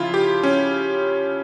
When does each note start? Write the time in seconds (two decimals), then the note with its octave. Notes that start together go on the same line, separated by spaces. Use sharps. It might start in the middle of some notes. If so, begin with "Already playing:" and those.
Already playing: C#3 F3 E4 F4
0.14 G4
0.43 C#4